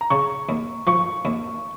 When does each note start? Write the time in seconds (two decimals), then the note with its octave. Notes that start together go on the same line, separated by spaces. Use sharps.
0.01 A#5
0.10 C#3 C#6
0.49 D#2
0.87 F3 C#6
1.25 D#2